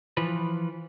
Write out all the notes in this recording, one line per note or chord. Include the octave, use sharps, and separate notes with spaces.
E3 F3 B4